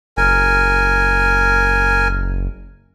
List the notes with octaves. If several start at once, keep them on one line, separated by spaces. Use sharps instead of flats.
F#1 A#4 G#5